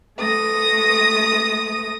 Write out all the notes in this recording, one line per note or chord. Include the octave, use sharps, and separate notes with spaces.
A3 D#6 A#6